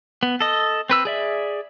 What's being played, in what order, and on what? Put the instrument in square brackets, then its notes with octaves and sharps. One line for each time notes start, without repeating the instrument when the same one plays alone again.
[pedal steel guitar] B3
A4 D#5
C4 B4 E6
G#4 D5 E5